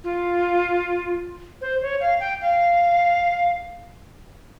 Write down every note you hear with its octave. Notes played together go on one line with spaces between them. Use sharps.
F4
C5
C#5
F5
G5
F5